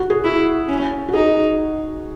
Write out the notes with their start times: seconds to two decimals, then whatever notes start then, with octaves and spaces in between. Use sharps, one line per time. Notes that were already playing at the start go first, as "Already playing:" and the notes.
Already playing: F#4
0.10 G#4
0.24 E4
0.68 C#4
1.08 F#4
1.13 D#4 G#4